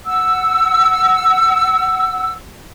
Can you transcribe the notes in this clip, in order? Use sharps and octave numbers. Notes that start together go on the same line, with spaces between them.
F#5 E6